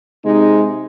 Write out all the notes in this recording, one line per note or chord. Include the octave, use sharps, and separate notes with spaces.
C3 G#3 D#4